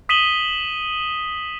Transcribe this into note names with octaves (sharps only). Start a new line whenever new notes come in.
D#6 B6 D#7 E7 F#7 G7